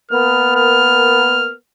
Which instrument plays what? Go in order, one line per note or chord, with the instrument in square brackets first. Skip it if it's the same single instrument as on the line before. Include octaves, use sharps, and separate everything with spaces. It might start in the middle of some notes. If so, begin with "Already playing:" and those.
[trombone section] A#3 B3 A#4 [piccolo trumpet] F6
[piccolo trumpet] F6